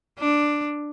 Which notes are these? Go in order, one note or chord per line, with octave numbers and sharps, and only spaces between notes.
D4